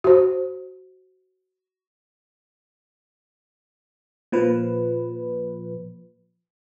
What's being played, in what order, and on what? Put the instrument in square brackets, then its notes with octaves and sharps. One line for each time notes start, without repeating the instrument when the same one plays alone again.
[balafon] F#4 C5
[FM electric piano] A#2 F3 B4